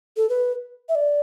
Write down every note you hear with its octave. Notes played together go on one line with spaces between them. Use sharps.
A4
B4
E5
D5